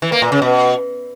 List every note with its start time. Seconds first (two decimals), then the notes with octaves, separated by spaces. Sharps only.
0.02 E3
0.12 A#3
0.22 A#2
0.32 C#3
0.42 B2